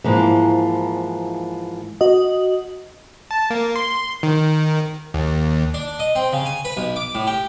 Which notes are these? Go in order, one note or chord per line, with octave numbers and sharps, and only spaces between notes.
G#2 E3 F3 A#3
F#4 D#5
A5
A#3
C6
D#3
D#2
D4
D#5
C4
C#3
G#5
B4
B1
D6
A2
G4